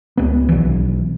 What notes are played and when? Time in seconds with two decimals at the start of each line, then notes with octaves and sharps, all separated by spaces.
0.17 C#2 B3
0.49 B1 E3